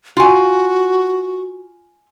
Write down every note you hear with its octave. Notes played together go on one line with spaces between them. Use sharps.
F4 F#4 G#5